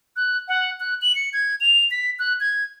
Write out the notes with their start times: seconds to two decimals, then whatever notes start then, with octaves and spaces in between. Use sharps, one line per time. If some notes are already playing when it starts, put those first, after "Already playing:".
0.16 F#6
0.48 F#5
0.80 F#6
1.02 F#7
1.15 C#7
1.33 G#6
1.60 F7
1.91 B6
2.19 F#6
2.40 G#6